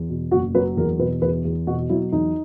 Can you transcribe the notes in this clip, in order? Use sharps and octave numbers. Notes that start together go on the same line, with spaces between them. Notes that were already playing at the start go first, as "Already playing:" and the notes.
Already playing: E2
B2
F#1 F#4
F#3 B4
E2 A#4
B2 B4
E2 B4
E2
B2 F#4
F#3 E4
E2 D#4